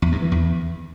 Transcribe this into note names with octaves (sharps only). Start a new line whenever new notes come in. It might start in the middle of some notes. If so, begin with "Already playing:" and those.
E2
G2
E3
E2